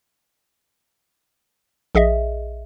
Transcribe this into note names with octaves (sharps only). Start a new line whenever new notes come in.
A#1 G#4 D#5 E5